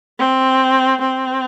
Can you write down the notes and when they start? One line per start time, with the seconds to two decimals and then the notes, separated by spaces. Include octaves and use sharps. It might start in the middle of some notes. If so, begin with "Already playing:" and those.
0.19 C4
1.01 C4